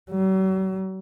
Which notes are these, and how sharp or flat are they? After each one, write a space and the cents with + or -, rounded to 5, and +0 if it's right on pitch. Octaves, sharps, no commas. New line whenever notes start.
F#3 +45